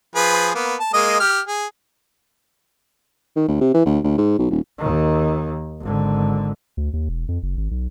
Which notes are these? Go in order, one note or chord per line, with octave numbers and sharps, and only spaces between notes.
F3 G#4 B4
A#3 B3
A5
G#3 A#3 D#5
G4 F6
G#4
D#3
D2
C3
E3
D2
D2
G#2
B1
D#1
D#2 D#3
G#1 D3
D2
D#2
E1
F2
F#1
G#1
B1